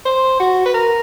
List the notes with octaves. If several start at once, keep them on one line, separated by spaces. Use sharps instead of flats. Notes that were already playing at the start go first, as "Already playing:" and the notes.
C5
F#4
B4
A#4